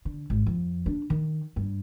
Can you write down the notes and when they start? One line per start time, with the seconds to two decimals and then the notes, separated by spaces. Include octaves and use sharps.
0.05 D3
0.30 G#1
0.46 F2
0.86 D4
1.10 D#3
1.56 G2